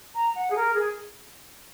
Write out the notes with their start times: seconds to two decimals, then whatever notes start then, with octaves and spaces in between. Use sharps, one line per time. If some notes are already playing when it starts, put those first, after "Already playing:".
0.15 A#5
0.34 F#5
0.50 G#4
0.55 A#4
0.75 G#4